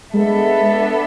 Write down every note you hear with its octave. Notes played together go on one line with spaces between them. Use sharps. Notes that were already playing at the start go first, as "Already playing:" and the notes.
G#3 B3 D4 A4 E5